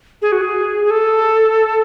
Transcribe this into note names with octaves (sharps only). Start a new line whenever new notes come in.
G#4
F#4
G#4
G#4
A4